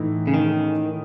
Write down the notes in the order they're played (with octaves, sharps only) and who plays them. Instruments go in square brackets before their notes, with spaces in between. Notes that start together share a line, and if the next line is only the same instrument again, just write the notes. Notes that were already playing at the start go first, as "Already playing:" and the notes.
Already playing: [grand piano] A2 E3 A3 D#4
[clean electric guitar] C#3
D#3